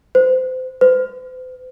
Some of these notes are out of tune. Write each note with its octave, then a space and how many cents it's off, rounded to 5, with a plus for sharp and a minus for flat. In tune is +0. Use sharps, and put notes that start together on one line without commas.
C5 -30
C5 -45